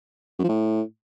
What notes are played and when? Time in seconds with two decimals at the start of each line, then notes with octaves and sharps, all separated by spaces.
0.39 F#2
0.44 F3
0.49 A2